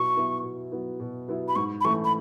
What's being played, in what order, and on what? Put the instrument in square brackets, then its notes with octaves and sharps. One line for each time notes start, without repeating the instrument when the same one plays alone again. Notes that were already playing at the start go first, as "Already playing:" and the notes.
Already playing: [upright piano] B2 F#3 B3 E4 [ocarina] C#6
[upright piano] F#3 B3 E4
B2
F#3 B3 E4
B2
F#3 B3 E4
[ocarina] B5
[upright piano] G#2 [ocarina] C#6
[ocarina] B5
[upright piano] E3 A3 C#4 [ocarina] C#6
[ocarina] B5